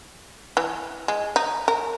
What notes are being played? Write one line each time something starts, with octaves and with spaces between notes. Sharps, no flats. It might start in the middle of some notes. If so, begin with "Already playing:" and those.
E3
G#3
D#4
A#4